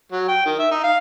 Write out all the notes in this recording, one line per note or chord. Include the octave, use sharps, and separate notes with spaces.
F#3
G5
D#3
E5
D#4
F5